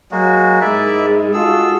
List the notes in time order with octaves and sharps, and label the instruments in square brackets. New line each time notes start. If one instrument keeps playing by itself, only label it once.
[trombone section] F#3 [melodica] G#3 A#3 F#4
[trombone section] G#2 A#4 [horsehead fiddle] G#3 D#4 [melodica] E4 D5 E5
[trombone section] F4 F#4 [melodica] G#4 A4 E6